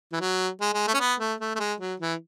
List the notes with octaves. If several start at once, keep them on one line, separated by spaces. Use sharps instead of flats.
E3
F#3
G#3
G#3
A3
C#4
B3
A3
A3
A3
G#3
F#3
E3